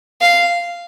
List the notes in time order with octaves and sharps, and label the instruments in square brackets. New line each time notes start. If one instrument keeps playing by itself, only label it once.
[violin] F5